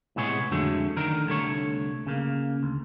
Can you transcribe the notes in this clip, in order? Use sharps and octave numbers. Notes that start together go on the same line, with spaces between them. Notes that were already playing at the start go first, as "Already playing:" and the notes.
A2 C3 G#3 B3 G#4 C#5
F2 D3 F#3 G#3 A3
D3 D#3 A#4
C2 D3 A3 C#5
C#3 A#3
D2